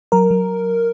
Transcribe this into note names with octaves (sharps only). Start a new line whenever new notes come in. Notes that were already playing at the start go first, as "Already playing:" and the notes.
F#3 A#4
F#3